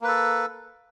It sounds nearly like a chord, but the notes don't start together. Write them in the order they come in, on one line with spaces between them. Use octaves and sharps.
A#3 B4 A4